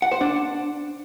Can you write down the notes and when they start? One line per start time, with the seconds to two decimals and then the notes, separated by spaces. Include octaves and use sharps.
0.02 F#5
0.12 C5
0.21 D4